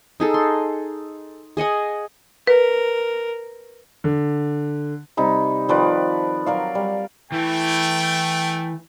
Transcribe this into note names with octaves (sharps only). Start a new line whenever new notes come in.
D#4 G#4 A4
C6
G#4 D#5 F#5 G#5
A#4 B4
D3
C3 G3 D#4 B5
D#3 F3 B4 D5
F#3 A#4 D5 F5
G3
E3 A3 G5